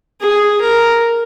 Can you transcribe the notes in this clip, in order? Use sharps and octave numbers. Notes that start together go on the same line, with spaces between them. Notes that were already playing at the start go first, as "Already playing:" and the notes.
G#4
A#4